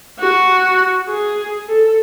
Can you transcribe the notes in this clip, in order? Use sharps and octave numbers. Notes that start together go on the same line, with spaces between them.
F#4
G#4
A4